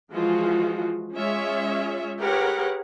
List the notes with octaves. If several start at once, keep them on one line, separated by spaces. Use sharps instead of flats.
E3 F3 G#3 F4 F#4
G#3 C#4 F4 C#5 E5
G4 G#4 A#4 B4 C#5 F#5